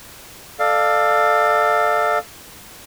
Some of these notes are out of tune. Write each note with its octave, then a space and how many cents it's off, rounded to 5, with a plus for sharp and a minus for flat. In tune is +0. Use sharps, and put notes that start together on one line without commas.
A4 +0 D5 +30 F5 +0